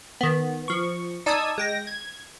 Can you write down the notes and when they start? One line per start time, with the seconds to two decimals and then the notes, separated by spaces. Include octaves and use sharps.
0.21 D#3 B3
0.68 F3 C#6
1.26 D#4 D5 A5 D#6 E6 G#6
1.58 G#3 G5 A#6
1.87 G#6